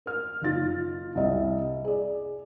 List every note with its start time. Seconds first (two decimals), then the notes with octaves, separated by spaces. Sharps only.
0.06 A#4 F6
0.42 F#1 D#4 F4 A6
1.15 C2 G3 D#5 E5
1.85 G#4 D5